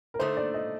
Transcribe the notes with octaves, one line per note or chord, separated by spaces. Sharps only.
A#4
D3 A3 D#4 C5
D5
D#5